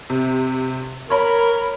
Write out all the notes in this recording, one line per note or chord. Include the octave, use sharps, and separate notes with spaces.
C3
A#4 C#5 B5